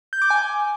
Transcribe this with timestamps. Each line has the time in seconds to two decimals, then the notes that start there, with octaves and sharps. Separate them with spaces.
0.13 G6
0.22 D6
0.30 G#5